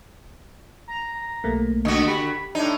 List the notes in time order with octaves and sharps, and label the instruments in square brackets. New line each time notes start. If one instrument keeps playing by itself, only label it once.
[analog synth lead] A#5
[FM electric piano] B1 A3 A#3
[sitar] D3 F#4 [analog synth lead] D#5
[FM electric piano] G4 [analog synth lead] B5
[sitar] A2 D#4 [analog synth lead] D4